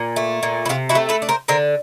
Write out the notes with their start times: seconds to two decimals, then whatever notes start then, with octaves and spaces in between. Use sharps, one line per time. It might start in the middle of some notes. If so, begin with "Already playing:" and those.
Already playing: A#2
0.16 A3
0.43 A#2
0.65 E4
0.69 C3 F4
0.89 E4 F#4
0.95 A3
1.09 A4 B4
1.22 D4
1.29 A#4 C5
1.48 D3 A#4 C5